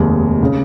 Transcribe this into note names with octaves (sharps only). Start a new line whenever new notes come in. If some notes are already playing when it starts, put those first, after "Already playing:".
Already playing: F1 D#2 D#3 G#3
C#3